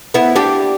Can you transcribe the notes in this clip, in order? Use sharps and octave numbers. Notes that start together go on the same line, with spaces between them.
B3 E4
D4 G4